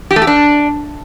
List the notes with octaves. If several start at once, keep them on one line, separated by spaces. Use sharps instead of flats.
G4
A3
G4
D4